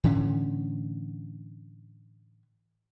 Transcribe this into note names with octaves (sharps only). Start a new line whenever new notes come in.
A2 D3 E3 C#4